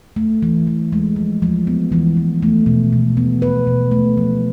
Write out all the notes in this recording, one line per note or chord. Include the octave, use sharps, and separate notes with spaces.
A3
E3
E3
G#3
F3
F3
B3
E3
E3
A3
B2
B2
B3
B4
B2
A3
F3